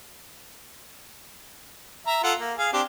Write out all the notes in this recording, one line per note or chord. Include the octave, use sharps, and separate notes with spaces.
E5 A#5
F4 A4 F#5
A#3
G#4 F5
C4 D4 G4